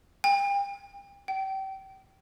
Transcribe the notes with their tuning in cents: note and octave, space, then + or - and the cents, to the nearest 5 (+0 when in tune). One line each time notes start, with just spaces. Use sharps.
G5 +35
G5 -30